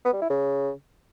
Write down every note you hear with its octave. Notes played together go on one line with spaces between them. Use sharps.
B3
G3
E4
C#3